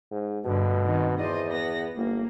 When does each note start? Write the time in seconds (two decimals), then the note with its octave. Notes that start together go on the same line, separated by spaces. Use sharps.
0.11 G#2
0.45 G2 B2 D3
0.84 D#3 C4
1.19 E2 C5 D5 D#5
1.48 B3 A#6
1.96 G1 A#3